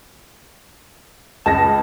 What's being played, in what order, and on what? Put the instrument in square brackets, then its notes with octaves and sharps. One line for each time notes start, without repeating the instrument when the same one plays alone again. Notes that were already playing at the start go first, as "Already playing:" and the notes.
[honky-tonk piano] C#2 D#5 A#6 [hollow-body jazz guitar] A5